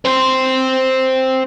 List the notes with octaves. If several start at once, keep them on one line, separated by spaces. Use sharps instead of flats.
C4 C5